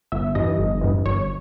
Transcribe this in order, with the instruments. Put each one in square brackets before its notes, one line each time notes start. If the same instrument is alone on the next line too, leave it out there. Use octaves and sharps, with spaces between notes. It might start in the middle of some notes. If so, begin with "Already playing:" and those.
[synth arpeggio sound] G1 E5
G2 E3 D#5
G1
G2 E3
G1 C#5